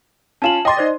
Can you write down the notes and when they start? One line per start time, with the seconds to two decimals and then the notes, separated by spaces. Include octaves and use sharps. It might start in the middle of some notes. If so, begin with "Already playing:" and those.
0.42 C#4 F4 A5 E7 F#7
0.65 D#5 G5 C6 D6 A6
0.77 D#4 C5 D5